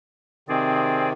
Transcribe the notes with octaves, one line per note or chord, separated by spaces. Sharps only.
C3 D#3 C4 G#4 D5